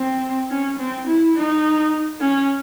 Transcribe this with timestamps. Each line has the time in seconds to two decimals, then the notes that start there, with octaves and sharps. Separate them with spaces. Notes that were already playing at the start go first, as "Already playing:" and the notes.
Already playing: C4
0.50 C#4
0.79 C4
1.07 E4
1.35 D#4
2.20 C#4